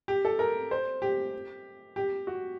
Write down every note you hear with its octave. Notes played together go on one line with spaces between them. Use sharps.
G4
A4
A#4
C5
G4
G4
F#4